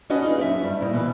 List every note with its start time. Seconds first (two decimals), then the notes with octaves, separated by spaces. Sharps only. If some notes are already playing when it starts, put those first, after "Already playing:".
0.10 C#4 D4 F#4 B4 D#5
0.21 C#4 D#4 F4 G#4
0.37 F#2 A#4 E5
0.63 G2
0.80 G3 E4 A#4 C5 D#5
0.93 B2 E3